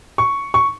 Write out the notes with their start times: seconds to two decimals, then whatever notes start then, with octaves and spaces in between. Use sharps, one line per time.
0.18 C#6
0.54 C#6